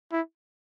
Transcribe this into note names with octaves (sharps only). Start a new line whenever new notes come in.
E4